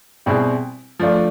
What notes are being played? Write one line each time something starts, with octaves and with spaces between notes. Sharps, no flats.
B2 G3 C4 E4 G#4
F3 A3 D4 F4